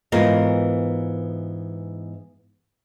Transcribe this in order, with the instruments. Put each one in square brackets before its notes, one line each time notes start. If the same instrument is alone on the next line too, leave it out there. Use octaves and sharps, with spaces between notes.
[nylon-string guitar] G#2 E3 B3 F4 A#4 D#5